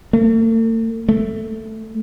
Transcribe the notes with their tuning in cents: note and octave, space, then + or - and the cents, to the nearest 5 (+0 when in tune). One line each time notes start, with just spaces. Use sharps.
A3 +45
A3 +5